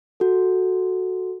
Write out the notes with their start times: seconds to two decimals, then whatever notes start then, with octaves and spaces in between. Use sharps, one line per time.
0.20 F#4 A4